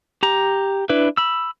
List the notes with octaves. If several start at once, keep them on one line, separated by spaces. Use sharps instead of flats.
G4 A#5
D4 E4 B4
B5 E6